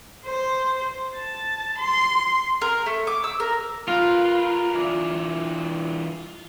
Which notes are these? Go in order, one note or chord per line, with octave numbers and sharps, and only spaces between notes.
C5
A5
C6
A#4
A3
D6
E6
A#4
F4 A#4 B4
E3 D4